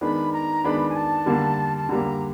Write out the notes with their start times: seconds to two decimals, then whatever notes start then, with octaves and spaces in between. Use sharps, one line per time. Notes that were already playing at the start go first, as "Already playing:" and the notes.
0.01 D#3 G#3 B3 D4 B5
0.33 A#5
0.64 D#3 G#3 B3 D4 B5
0.89 G#5
0.96 A5
1.26 D3 G3 A#3
1.78 A5
1.89 D3 G3 A#3 A#5